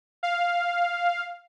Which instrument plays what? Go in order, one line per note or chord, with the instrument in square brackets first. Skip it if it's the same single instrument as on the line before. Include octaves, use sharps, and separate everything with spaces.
[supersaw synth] F5